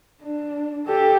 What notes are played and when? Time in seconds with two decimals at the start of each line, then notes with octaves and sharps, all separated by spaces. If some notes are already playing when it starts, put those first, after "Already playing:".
0.23 D4
0.86 G4 A4